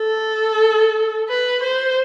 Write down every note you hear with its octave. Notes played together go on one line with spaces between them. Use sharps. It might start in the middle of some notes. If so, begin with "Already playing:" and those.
Already playing: A4
B4
C5